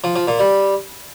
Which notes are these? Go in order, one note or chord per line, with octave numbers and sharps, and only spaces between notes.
F3
F3
A#2
G3